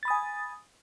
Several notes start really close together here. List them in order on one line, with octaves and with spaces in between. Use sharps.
A6 B5 D#6 G#5